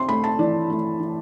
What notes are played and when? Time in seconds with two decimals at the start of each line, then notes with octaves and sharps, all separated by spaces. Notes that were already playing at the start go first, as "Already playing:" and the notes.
Already playing: C4 C6
0.09 A3 B5
0.24 A5
0.39 E3 D5
0.70 A3
1.00 E3